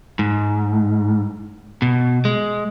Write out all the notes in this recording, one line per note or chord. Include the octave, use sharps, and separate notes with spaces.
G#2
B2
G#3